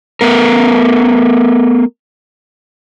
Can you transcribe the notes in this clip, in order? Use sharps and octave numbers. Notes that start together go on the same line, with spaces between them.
A3 B3 A#4